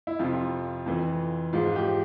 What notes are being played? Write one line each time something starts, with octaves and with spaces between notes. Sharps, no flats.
E4
F2 C3 F3 F4
F2 E3
G#2 F3 F4
G4